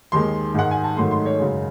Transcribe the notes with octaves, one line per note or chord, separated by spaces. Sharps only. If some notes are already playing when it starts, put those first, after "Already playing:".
D#2 D#3 G#3 C6
G#2 D#3 G#3 F#5
G#5
A5
G#2 D#3 F#3 A3 C6
C6
C#5
F#2 C#3 G#3